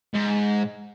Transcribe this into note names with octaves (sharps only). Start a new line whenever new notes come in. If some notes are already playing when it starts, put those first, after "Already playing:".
G#2